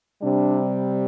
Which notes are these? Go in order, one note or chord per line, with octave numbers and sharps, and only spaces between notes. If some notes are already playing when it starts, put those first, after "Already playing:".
C3 G3 D4